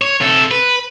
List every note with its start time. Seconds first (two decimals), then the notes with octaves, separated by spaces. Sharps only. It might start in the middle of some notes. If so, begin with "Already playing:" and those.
0.02 C#5
0.21 C3 A4
0.51 B4